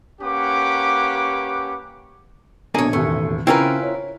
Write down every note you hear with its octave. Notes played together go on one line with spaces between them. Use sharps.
A#3 C#4 G4 B4 F#5 D6
A#1 B2 D3 A#3 G#4 A4 C#5 D#5
E1 A1 D#2 A3
C#3 C4 C#4 E4 F4 A#4 B4
C#5